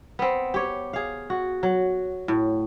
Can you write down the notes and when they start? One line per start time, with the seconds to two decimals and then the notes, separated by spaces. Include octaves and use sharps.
0.19 B3 C4
0.54 G4 C#5
0.93 G#4 F5
1.30 F#4
1.63 F#3
2.28 A2